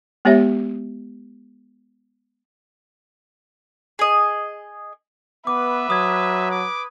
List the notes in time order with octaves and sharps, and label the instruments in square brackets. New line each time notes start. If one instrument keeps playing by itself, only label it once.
[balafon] G#3 B3 G4 C#5 E5
[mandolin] G#4 D#5
[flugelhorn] B3 [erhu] B4 [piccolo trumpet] E5 [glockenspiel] D6
[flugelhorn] F#3 [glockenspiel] D#6 G#6
[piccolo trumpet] D6